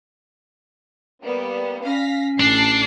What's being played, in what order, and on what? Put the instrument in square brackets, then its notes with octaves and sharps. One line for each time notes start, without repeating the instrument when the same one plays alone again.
[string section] G3 A#3 B3
[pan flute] C#4 [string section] F5 A#6 B6
[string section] A1 A4 [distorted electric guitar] D4 [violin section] C7